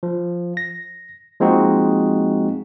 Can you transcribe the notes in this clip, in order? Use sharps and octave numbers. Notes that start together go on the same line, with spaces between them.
F3
A#6
F3 G#3 A#3 C4 D#4 F#4